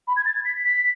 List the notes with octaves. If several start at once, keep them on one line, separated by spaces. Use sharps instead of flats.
B5
G#6
A6
G#6
B6
B6